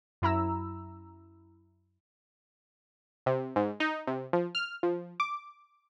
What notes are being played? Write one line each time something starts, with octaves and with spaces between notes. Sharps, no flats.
F#2 E4 A#5 E6
C3
G#2
D#4
C3
F3
F6
F3
D6